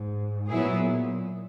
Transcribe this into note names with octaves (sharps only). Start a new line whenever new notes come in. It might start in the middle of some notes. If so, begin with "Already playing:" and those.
Already playing: G#2
A#2 F#3 B3 E4 G#4